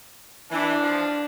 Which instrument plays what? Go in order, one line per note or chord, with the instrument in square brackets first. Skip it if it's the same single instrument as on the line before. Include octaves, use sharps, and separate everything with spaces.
[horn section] E3 [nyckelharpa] D4
[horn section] F3